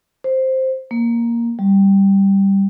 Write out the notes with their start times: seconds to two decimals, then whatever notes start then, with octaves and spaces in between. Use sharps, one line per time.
0.24 C5
0.91 A#3
1.59 G3